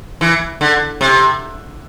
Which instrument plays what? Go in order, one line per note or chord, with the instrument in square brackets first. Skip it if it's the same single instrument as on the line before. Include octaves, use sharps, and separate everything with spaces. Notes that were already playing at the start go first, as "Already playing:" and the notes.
[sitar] E3
D3
C3